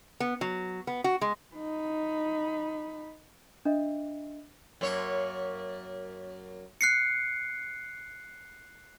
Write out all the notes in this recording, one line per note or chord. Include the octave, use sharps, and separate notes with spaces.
B3
F#3
B3
F#4
G#3
D#4 B5
D4 D#5 E5
F#2 A#3 C#5
F#6 C7 C#7